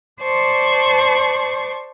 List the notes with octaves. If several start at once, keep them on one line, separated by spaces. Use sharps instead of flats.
C5 D5 A5 C#6